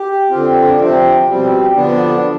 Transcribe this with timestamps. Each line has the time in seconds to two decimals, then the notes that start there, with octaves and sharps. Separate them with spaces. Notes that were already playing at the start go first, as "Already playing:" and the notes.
Already playing: G4
0.30 D3 F3 C4 F4
0.63 D4
0.79 C3 F3 C4
1.28 B2 G3 C4
1.76 D3 F3 B3 D4